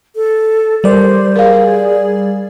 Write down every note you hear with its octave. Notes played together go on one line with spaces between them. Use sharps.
A4
G3 A#4 C5 D5
G#4 A#4 F5